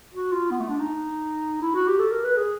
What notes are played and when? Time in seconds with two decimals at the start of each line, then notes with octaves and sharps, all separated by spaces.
0.14 F#4
0.32 F4
0.51 B3
0.60 A3
0.69 D4
0.79 D#4
1.62 E4
1.75 F#4
1.88 G4
1.99 A4
2.11 A#4
2.24 B4
2.37 G#4